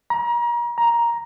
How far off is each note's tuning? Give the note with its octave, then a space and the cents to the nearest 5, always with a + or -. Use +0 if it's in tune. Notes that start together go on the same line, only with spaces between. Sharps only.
A#5 +35
A#5 +10